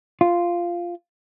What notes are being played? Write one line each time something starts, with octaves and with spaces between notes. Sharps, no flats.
F4